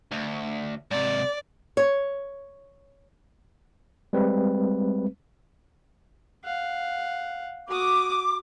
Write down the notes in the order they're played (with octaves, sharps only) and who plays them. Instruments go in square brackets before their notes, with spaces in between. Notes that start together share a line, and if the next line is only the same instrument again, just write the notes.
[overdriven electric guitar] D2
[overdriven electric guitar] G#2 C3 [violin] D5
[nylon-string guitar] C#5
[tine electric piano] G3 G#3 C4 B4
[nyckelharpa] F5 F#5
[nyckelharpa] F#4 D#6 [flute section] D6